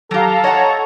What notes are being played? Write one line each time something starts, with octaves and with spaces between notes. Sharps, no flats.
F#3 G4 A4 F5 A#5
C#5 D#5 F#5 A#5